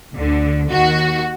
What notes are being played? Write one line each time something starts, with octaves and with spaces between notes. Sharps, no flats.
D2 D3
D#2 D#3 F#4